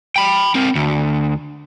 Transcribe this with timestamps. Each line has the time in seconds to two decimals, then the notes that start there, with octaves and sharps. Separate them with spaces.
0.16 G5 B5
0.55 C4 A#4
0.76 D2